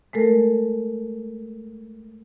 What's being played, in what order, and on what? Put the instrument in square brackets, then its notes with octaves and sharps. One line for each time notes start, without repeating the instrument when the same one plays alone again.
[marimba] G#3 A3 A4 A#4